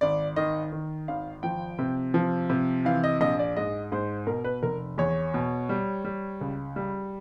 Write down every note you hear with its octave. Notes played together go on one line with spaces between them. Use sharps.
G#1 D5
D#3 D#5
D#3
G#1 F5
F3 G5
C3
F3
C3
E3 F5
D#5
A#1 D#5
D5
G#2 D#5
G#2 C5
B2 A#4
B4
F1 A#4
E2 C#5
B2
G3
G3
C#2
G3